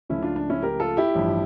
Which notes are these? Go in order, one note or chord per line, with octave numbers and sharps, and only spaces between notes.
C#2 C#3 F3 A3 C#4 E4
D4 F4
D4
C#4 E4
G4 A#4
F4 A4
E4 G4
A1 G2 F3